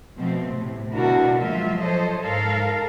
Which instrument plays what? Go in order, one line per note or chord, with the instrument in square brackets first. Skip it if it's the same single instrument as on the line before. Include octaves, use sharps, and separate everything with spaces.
[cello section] B2 F3 A3 C4
A2 C3
B2 D3 D4 E4 F#4 A#4
F3 F#3 G#3 A#3 F4 E5
A4 C5 C#5 D#5
G#2 A4 A#4 F5